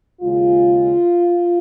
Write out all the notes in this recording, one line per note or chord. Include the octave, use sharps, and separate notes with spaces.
D#2 C#3 G#3 F4